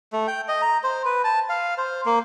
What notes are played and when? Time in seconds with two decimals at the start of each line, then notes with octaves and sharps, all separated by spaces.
0.13 A3
0.27 G5
0.48 D#5
0.62 A#5
0.84 C5
1.05 B4
1.24 A5
1.49 F5
1.78 C5
2.06 A#3